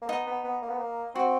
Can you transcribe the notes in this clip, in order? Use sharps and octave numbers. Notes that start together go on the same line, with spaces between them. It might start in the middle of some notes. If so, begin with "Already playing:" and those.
A#3
B3 D#4
B3
B3
A#3
B3
A#3
C4 F#4